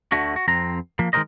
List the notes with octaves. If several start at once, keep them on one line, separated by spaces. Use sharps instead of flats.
D2 D3 A3 F#4
F#4
F2 C4 A#5
F3 A#3
D#3 G#3 A3 A#4 C5 D#5